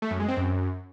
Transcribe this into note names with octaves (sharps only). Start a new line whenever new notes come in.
A3
F#2
G#3
C4
F#2